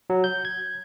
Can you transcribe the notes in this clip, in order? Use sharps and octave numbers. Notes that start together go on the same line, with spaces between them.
F#3
G6
G#6